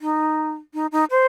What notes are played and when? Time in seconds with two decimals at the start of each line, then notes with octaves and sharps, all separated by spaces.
0.01 D#4
0.74 D#4
0.92 D#4
1.10 C5